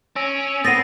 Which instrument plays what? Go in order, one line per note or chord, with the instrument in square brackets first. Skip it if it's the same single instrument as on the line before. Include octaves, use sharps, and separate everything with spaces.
[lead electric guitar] C#4 [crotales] E6 A#6 D7
[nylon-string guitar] B3 C4 [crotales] D#6 C7 [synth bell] A6 A#6 D#7